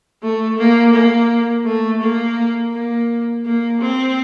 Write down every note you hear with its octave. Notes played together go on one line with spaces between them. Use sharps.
A3
A#3
A#3
A3
A#3
A#3
A#3
C4